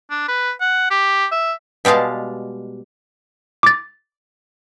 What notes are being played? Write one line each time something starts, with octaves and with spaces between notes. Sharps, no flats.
D4
B4
F#5
G4
E5
B2 G3 G#3 F5 A5
D6 A6